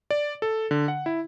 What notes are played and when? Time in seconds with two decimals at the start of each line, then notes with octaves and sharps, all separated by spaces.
0.11 D5
0.42 A4
0.71 D3
0.88 F#5
1.06 E4